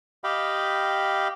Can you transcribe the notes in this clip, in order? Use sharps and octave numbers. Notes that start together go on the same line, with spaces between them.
G4 D#5 F5 G5 B5